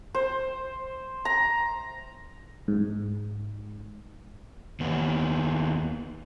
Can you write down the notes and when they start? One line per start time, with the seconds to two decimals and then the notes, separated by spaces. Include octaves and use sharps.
0.15 C5
1.25 A#5
2.68 G#2
4.80 D#2 B3